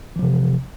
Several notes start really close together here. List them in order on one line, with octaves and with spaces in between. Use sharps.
E3 F3 C3